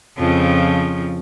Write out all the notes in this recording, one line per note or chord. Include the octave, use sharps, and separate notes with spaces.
F2 C#3 F3